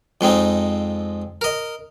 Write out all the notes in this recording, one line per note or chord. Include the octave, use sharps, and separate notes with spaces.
F2 G#3 C4 D#4
A#4 D#5